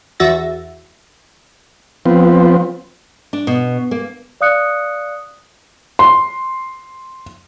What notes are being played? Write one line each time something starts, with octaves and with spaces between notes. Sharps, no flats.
E2 F#4 E5 A6 A#6
F3 B3 C4
D4
B2
A#3
D5 F5 D#6 F#6 C#7
C6